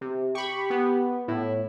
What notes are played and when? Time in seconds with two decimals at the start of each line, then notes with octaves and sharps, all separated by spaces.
0.01 C3
0.35 G4 B5 C#6
0.70 B3
1.28 A2 E4